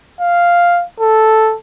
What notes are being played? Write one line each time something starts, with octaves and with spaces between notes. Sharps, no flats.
F5
A4